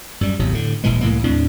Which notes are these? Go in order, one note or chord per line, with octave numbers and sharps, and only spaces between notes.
F#2 G3
G#1 E2 C3 F#3
A2 D3
D#1 A#1 E3 G#3
C2 A2 E3 A#3
D#2 A2 C4 D4